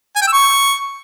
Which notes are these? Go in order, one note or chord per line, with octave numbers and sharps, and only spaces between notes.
G#5
G5
E6
C#6